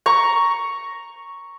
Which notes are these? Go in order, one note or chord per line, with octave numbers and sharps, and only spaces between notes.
A#5 C#6